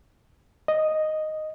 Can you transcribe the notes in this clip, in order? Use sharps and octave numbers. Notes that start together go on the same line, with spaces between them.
D#5